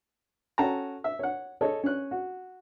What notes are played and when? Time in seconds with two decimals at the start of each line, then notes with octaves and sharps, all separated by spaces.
0.58 C#4 F#4 A4 G5 A5 A#5
1.04 E5
1.19 C#5 F#5
1.61 G#4 A4 C#5 D#5
1.83 C#4 F#6
2.11 F#4